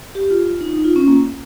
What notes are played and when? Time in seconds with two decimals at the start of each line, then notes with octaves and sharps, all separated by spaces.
0.15 G4
0.31 F4
0.46 F4
0.61 D#4
0.73 D#4
0.84 F4
0.96 C#4
1.08 A#3